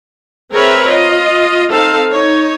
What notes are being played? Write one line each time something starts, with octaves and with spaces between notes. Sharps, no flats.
C4 G#4 A#4 B4 C#5 E5
F4 D#5
C4 D#4 A4 F5
D#4 C#5